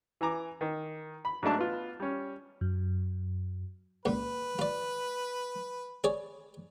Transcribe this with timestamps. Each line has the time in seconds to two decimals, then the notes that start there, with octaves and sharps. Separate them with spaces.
0.21 E3 G#5 A#5 D6
0.61 D#3
1.25 B5
1.43 G#2 F#3 A3 D4 A5
1.56 B3 F4
2.00 G3 C#4
2.61 F#2
4.05 C#2 A#2 B4
4.59 F4 D5
6.04 G#4 C#5 D5